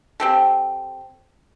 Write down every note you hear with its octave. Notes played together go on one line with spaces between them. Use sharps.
C4 G4 A4